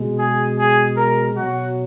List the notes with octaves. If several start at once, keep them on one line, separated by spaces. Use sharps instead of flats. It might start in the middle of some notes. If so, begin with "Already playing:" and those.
Already playing: B2 G#3
G#4
G#4
A#4
B2 F#3 F#4